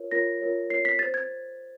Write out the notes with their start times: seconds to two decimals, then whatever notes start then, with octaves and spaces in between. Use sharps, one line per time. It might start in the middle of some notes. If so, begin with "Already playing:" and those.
Already playing: F4 A#4 C#5
0.11 F4 A#4 C#5 A#6
0.41 F4 A#4 C#5
0.70 F4 A#4 C#5 C7
0.85 B6
0.99 G4 C5 A6
1.14 G#6